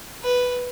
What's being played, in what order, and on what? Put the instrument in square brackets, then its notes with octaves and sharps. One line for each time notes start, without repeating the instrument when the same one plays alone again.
[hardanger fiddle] B4